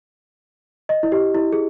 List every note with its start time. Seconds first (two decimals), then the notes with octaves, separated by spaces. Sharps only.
0.89 D#5
1.03 E4
1.12 G4
1.35 E4
1.53 G#4